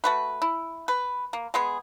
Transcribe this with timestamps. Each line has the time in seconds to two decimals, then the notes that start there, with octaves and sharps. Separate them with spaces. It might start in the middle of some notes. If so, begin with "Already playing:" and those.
0.04 A3 F#4 B4
0.42 E4
0.88 B4
1.33 A#3
1.54 G#3 B3 G#4